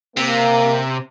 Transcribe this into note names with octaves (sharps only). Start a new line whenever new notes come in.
C3 A#3